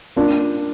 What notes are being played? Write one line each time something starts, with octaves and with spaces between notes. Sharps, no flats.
A#3 D4 F4